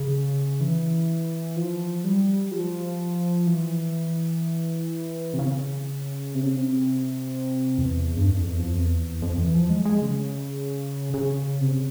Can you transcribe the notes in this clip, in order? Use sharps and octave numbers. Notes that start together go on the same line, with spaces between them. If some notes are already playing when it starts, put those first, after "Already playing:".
Already playing: C#3
E3
F3
G3
F3
E3
C3
C#3
C3
C#3
C3
E2
G2
F2
E2
F2
E2
F2
E3
F3
G#3
G#3
C#3
C#3
C3
C#3